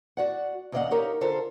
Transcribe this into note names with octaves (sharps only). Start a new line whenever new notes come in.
F#4 D5 F#5
D#2 C#3 D5 D#5 F5 F#5
D#4 G4 A#4 C#5 F5
D3 F4 A4 A#4 C5